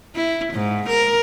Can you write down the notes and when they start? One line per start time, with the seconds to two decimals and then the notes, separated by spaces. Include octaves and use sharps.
0.15 E4
0.54 G#2
0.89 A#4